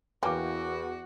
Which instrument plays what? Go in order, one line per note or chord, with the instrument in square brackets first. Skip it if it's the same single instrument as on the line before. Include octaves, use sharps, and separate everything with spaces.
[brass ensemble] E2 [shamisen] A#3 C#4 [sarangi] F#4 [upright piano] B4 G5 D6